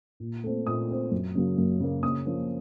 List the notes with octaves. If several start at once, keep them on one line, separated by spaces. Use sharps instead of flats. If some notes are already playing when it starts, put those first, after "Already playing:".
A#2
A3 C4
A#2 D#6
A3 C4
F#2
C#3 F#3 A#3
F#2
C#3 F#3 A#3
C#3 D#6
F3 A#3 C#4